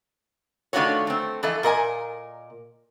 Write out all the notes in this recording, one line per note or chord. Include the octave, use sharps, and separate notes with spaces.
D#3 A3 D4 F4 F#4 C#5
A3 C4
E3 F3 A4 D#5
A#2 A#4 D#5 G#5